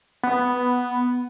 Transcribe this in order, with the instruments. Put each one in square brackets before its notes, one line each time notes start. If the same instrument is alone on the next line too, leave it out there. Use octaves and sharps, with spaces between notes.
[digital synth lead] B3